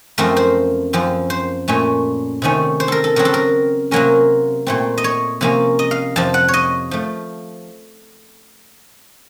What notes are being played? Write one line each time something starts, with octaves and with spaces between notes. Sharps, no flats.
F#2 F3 A3 C4 A#4
C5
F#2 F3 C4
C5
A#2 A3 C#4
C3 D#3 A3 C#4
C5
A4 A#4
A4
C#3 F#3 C4 A#4
A4
A#4
C3 F#3 A#3 C#4 A#4
A#2 A3 C4
D#5
C#5
C3 F3 A#3 C#4
D#5
F5
F2 C3 F3 A5
F#5
C#5
D#5
F3 A3